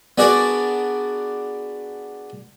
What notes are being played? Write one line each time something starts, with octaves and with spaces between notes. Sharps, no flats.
B3 D4 F#4 G#4 A#4 D5